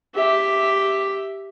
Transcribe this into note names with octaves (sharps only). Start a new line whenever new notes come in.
G4 E5